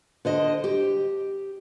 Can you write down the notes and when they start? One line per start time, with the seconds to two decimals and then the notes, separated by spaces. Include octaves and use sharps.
0.25 D3 C5 D#5
0.64 G4